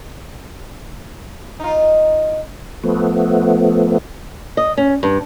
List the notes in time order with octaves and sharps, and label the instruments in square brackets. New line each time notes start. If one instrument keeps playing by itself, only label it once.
[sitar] D#4 F4
[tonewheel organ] F3 A3 B3
[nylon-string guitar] D#5
C#4
G2